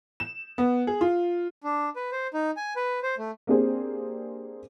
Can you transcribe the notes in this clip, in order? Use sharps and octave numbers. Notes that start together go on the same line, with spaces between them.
E7
B3
G#4
F4
D4
B4
C5
D#4
G#5
B4
C5
A3
A#3 C4 D4 G4 G#4 C5